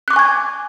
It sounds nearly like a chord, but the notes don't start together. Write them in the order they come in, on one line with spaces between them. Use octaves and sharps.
F#6 D6 C#6 G#5 G#6